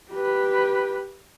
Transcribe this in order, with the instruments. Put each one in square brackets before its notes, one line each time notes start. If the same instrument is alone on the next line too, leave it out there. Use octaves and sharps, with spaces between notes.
[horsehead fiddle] G4 B4